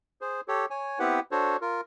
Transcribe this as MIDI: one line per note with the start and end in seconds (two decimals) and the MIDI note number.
0.21 0.41 68
0.21 0.41 72
0.48 0.66 67
0.48 0.66 69
0.48 0.66 73
0.70 0.99 73
0.70 0.99 80
0.99 1.20 59
0.99 1.20 60
0.99 1.20 64
0.99 1.20 67
0.99 1.20 71
0.99 1.20 78
1.31 1.57 62
1.31 1.57 66
1.31 1.57 69
1.31 1.57 72
1.31 1.57 73
1.61 1.81 65
1.61 1.81 70